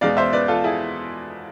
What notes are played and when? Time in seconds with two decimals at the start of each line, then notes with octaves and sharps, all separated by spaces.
0.01 E2 B2 G#3 D5 F5
0.17 C5 E5
0.33 B4 D5
0.48 F4 A4
0.64 E4 G#4